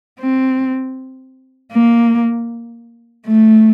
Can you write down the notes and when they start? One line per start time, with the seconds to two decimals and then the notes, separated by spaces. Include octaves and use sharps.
0.20 C4
1.73 A#3
3.27 A3